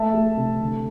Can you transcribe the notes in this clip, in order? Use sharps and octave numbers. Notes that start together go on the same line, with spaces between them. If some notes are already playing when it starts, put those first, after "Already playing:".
Already playing: A3 E5 A5
A3
C3
D3